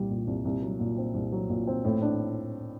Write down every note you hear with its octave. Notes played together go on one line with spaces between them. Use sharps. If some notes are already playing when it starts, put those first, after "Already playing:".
Already playing: C2 A#2 G3
A#2
C2
C2
F#3
A#2
C4
C2
F#3
A#2
C4
A2
D4